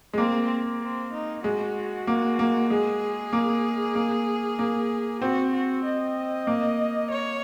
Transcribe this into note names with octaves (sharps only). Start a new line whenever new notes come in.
G#3
A#3 C4
C4
D#4
G#3 F#4
A#3
A#3
G#3 G#4
A#3
A#3
A#3
C4 F#4
F#4
D#5
A#3
C#5